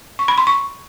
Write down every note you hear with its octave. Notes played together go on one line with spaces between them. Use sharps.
C#6
B5
C6
C#6